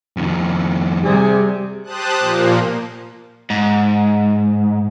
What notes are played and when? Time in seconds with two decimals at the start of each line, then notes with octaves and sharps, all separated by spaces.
0.17 F2 D#3
1.03 C3 G3 G#4
1.84 G4 C5 A5 D#6 F#6
2.19 A#2 F3 A#3
3.50 G#2